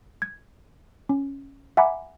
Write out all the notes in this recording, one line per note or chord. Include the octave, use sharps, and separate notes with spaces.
G#6
C#4
E5 F#5 G#5 A#5 B5 D6